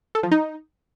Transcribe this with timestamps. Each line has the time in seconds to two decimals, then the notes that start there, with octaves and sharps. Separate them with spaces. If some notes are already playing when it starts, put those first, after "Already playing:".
0.15 A4
0.23 F3
0.31 D#4